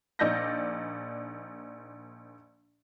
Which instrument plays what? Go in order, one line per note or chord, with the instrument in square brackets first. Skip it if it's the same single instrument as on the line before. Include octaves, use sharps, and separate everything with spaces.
[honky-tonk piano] A#1 D#4 D5 D#5 G6 A#6